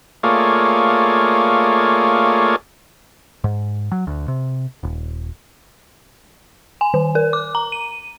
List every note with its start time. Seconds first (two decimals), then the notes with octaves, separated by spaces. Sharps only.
0.23 A3 A#3 F4 G#4 C#5 D5
3.44 G#2
3.92 F#3
4.07 D2
4.28 C3
4.83 D#1
6.81 G#5
6.94 D#3
7.15 A#4
7.33 D6
7.55 A#5
7.72 D#7